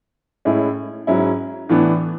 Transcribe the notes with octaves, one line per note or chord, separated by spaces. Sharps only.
A2 G#3 C#4 E4
G#2 F#3 C#4 E4
A2 E3 B3 D4